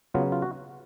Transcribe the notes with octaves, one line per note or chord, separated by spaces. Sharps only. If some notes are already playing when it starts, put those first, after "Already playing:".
C#3 F#3 B3 F4
F4
F#4